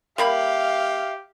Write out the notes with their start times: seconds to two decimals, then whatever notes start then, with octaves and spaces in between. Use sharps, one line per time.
0.18 G3 A#3 G4 E5 F5 B5